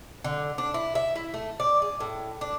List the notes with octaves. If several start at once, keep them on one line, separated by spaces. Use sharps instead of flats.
D3
D4
E4
E5
E4
A3
D5
G#4
A2
D4